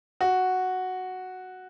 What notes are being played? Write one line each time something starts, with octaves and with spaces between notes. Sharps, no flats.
F#4